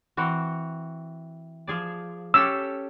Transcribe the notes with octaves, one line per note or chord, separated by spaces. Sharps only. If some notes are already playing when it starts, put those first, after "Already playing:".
E3 C4 F#4
F3 G#4 D5
C#4 G4 A4 E6